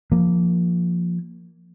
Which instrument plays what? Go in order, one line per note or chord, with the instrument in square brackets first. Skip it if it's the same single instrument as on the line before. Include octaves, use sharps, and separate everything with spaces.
[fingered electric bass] F3 A#3